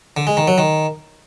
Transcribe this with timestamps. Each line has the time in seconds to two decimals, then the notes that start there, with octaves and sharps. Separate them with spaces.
0.17 D3
0.27 G#3
0.37 D#3
0.48 F#3
0.58 D#3